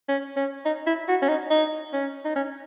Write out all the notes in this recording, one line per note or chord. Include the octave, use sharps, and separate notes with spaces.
C#4
C#4
D#4
E4
F#4
C#4
D#4
D#4
C#4
D#4
C#4